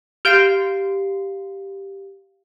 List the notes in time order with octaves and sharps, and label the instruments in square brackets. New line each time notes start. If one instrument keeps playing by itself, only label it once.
[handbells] G4 F5 C7 [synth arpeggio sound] F6 G6 D7